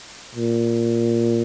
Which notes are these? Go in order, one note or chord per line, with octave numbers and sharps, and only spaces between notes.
A#2